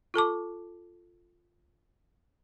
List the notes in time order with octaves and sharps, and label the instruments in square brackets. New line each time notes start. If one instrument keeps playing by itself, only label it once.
[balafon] F4 A4 A5 D6